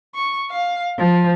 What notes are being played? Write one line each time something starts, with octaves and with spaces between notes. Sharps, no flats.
C#6
F5
F3